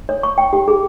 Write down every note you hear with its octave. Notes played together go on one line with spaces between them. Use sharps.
C#5
C#6
G5
G4
G#4